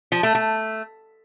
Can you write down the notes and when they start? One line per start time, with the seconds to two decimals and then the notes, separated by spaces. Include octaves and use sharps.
0.12 F3
0.23 A3
0.35 A3